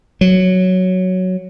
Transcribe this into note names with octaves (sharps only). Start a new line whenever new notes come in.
F#3